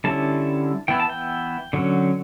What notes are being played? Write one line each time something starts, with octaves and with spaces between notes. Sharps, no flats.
D3 G3 C#4 E4 A5
E3 B3 E4 G5
A5
G5
D3 F#3 C#4